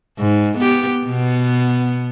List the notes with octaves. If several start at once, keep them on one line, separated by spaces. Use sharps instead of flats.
G#2
B3 G4
B2 B3